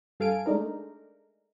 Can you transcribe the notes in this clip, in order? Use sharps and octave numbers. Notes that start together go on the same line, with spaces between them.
G2 A4 F5 G#5 D7
G#3 A3 D4 D#4 A#4